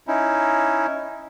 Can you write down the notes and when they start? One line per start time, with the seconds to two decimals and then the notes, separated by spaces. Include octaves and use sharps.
0.07 C#4 D#4 E4